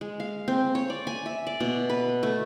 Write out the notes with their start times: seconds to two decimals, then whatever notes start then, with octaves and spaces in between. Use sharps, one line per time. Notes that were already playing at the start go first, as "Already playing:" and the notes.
0.01 G#3
0.20 F5
0.48 C4
0.75 C#5
0.90 D5
1.07 G#5
1.26 E5
1.47 D5
1.60 B2
1.89 B4
2.23 A3